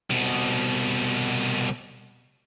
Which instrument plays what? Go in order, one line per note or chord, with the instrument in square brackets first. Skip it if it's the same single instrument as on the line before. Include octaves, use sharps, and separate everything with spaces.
[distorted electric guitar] C2 B2